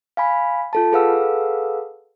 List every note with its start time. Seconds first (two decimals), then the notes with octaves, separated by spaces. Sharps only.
0.17 F5 G#5 B5
0.73 F4 A4 A5
0.92 G#4 A4 B4 F5 F#5 E6